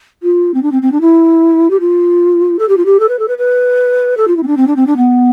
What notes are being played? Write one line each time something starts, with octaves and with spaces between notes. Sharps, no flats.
F4
C4
D4
C4
C4
D4
E4
G4
F4
A4
G4
F4
G4
A4
B4
A4
B4
B4
A4
F4
E4
C4
D4
C4
D4
C4
D4
B3